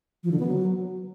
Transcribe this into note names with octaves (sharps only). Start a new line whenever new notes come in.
F3
D3
B3
F#3